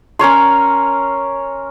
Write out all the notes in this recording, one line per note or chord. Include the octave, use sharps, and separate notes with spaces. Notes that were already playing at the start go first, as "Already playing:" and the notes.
C#4 A#4 C#5 C6